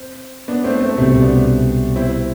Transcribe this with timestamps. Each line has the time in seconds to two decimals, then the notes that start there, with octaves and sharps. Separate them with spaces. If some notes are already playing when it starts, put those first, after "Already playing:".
Already playing: C4
0.48 B3 D4
0.64 A3 C4
0.81 A3 C4
0.97 C2 B2 G3 A3 C4
1.22 B3 D4
1.96 C4 E4